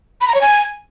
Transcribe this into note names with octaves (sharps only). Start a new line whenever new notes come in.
B5
A#5
C#5
G#5